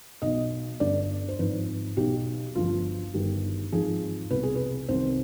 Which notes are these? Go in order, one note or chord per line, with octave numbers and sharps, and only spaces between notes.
B1 B2 D#5
G1 G2 D3 D5
C5
G#1 G#2 F3 B4
B1 B2 G4
G1 G2 F3 F4
G1 G2 D#3 G4
G#1 G#2 F3 G#4
C2 B2 B4
G#4
B4
C2 C3 D#3 C5